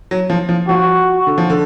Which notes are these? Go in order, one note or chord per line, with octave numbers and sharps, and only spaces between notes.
F#3
F3
F3
F3 F#4
D3
F3
D3